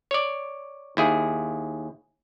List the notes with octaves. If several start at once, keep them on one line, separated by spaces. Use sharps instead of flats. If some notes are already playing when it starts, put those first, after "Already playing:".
C#5 D5
D#2 E4 G#4